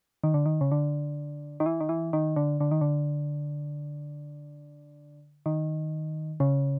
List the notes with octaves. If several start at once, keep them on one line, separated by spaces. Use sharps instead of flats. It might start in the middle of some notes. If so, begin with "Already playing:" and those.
D#3
D3
D#3
C#3
D3
D#3
E3
D#3
E3
D#3
D3
D3
D#3
D3
D#3
C#3